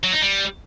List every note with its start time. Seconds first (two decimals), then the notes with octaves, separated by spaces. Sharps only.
0.03 F#3
0.12 D#4
0.22 G3